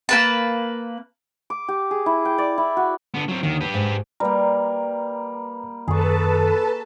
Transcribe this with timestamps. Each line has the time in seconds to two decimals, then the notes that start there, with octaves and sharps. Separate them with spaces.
0.09 A#3 B4 A5
1.50 D6
1.68 G4
1.91 G#4
2.06 E4
2.25 G5
2.38 D5
2.58 E4
2.77 F#4
3.14 D3 B3
3.29 F#3 C4
3.43 D#2 D3 D#3
3.61 G4 B4
3.74 G#2
4.20 G3 A#3 B4 A#5
5.88 F#2 D#3 G#4 A4 B4 A5 C#6